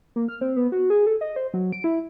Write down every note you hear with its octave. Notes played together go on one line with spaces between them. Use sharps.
A#3
F6
C4
B3
F#4
G#4
A4
D#5
C5
F#3
D7
E4